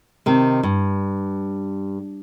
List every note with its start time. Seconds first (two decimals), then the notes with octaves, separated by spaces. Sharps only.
0.26 C3 D#3
0.63 G2